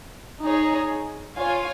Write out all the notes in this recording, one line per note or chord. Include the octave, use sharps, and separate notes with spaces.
D#4 G#4 C#5
F4 C#5 F5 G#5